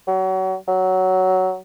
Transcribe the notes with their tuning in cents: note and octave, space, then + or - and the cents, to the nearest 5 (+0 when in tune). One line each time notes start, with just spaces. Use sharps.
F#3 +30
F#3 +10